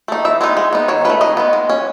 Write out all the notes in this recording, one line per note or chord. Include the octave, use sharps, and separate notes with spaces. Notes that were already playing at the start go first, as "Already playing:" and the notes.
A3 D#4
E3 E5
G#3 B3 D#4
G#3
B3 D#4
D#3 C#5
A3 C#4 B4
D#3 D#5
G#3 B3
G#3
C#4